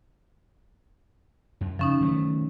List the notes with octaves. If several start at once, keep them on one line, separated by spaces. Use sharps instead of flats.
F#2
C#3 F3 C#4 D#4
D#3 F#3 A3